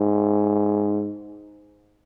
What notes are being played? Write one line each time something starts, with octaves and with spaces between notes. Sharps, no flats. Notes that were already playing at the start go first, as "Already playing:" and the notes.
Already playing: G#2